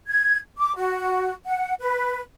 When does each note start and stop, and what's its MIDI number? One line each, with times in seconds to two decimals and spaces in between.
0.08 0.38 92
0.58 0.75 86
0.76 1.33 66
1.45 1.74 78
1.80 2.21 71